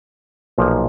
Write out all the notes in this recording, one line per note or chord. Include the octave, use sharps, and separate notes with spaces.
B1 A#2 F3 A#3 D#4